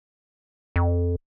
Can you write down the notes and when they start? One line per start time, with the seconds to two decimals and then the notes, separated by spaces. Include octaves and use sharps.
0.76 F2